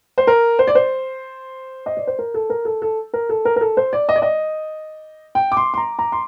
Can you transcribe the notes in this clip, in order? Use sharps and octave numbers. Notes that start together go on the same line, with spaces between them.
C5
A#4
C5
D5
C5
D#5
D5
C5
A#4
A4
A#4
A4
A4
A#4
A4
A#4
A#4
A4
C5
D5
D#5
D5
D#5
G5
D6
C6
C6
A#5
A#5
C6